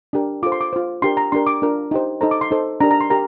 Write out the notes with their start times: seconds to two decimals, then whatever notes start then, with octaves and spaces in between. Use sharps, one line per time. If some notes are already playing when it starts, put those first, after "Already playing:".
0.13 D4 G4 A#4
0.43 F4 A4 C5 D6
0.52 C6
0.61 D6
0.73 F4 C5
1.02 D4 G4 A#4 C6
1.17 A#5
1.32 D4 G4 A#4 C6
1.47 D6
1.62 D4 F4 A#4
1.91 D#4 G4 C5
2.21 D#4 A4 C5 A#5
2.31 D6
2.41 C6
2.51 D#4 A4 C5
2.81 D4 G4 A#4 A#5
2.91 A#5
3.01 C6
3.10 G4 A#4 A#5